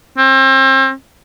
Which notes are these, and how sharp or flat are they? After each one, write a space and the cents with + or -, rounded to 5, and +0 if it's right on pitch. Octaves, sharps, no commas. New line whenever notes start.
C4 +35